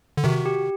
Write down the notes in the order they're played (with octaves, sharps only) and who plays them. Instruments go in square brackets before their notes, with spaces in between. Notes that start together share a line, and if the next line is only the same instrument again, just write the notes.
[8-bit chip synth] D3
[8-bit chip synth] C3 D#3 [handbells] F#4
[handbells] G4